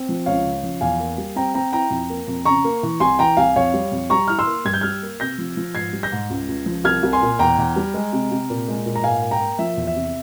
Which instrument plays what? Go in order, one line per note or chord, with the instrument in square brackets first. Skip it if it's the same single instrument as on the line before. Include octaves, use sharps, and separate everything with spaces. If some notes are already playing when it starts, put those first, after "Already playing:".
Already playing: [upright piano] C4
F3
C#2 C#5 F5
C#3
F3
E2 F5 G#5
A#3
G3
C4 G5 A#5
C4 G5 A#5
E4 G5 A#5
F2
A#3
F2
C#3 A#5 C#6
A#3
E3
C2 G#5 C6
E3 G5 A#5
C2 F5 G#5
F2 C#5 F5
G3
F2
G3 A#5 C#6
E4 F6
C6 E6
A#3
G2 G#6
G6
G3 F6 G#6
A#3
C3 G6 A#6
F3
F3
G#2 G#6 C7
G3
G6 A#6
G#2
C#2
C#2
F3
C2 F6 G#6
C2
G#5 C6
A#2
E2 G5 A#5
E2
G3
G#3
C3
C3
A#2
G#3
A#2
A#5
G#2 F5 G#5
A#3
G5 A#5
A#3
F3 E5
E2
E5
C3